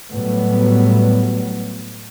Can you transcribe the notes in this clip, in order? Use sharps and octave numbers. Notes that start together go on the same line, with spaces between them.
A2 F#3 G3 B3